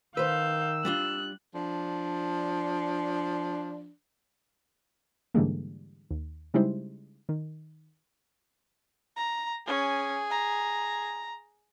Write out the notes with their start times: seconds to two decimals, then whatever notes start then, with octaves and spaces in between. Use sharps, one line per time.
0.17 D#3 B4 C5 F5 E6 G6
0.85 G3 D4 F4 F#6
1.54 F3 D4
5.34 G#2 D3 E3 G3 G#3 A#3
6.11 D#2
6.54 C#3 G3 G#3 D#4 E4 C5
7.29 D#3
9.17 A#5
9.67 C#4 G#4
10.30 A#5